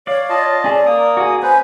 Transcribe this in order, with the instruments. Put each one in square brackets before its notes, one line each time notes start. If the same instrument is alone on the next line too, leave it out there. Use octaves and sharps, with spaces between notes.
[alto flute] C#5 [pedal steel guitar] D5 F5
[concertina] F4 D#5 A5
[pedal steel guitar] C#4 G#4 A4 [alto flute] D5
[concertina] A#3 D#6 [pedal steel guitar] A#4
[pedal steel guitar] F#4 G#4
[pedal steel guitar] C#4 [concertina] B4 C5 [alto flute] G#5